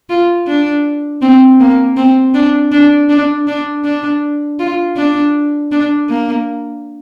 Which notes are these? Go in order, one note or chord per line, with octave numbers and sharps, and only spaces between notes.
F4
D4
C4
A#3
C4
D4
D4
D4
D4
D4
F4
D4
D4
A#3